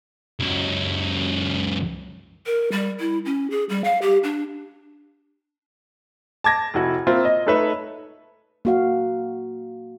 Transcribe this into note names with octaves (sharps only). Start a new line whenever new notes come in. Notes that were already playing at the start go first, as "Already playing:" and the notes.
C#2 F#2
A#4
G3
E4
C#4
G#4
G3
F5
G4
D4
A5 D6 G#6 A#6
F1 E4 F#4
A#3 C4 F4 E5
D#5
A3 D#4 A4 B4 C#5 E5
A#3 F#4 F5